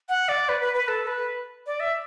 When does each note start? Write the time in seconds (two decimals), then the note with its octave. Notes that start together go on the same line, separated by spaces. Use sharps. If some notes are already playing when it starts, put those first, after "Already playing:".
0.09 F#5
0.29 D5
0.49 B4
0.61 B4
0.74 B4
0.88 A4
1.07 B4
1.67 D5
1.80 E5